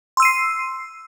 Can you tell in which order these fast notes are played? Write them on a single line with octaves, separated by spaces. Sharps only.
C6 E6 D#7 C7